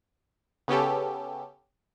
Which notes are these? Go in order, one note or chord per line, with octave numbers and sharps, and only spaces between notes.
C#3 B3 C#4 G4 A4